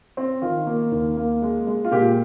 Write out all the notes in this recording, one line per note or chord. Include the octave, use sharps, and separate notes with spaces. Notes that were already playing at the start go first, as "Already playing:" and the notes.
C4
D#3 F4
A#3
D#2
A#3
G#3
G#3
F4
A#2 G4